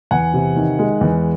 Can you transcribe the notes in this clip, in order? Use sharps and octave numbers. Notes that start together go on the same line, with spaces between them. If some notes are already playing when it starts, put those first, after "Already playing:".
E2 F#5 G#5
C3
D#3
G#3
E2